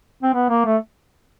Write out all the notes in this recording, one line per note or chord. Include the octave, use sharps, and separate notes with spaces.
C4
B3
A#3
A3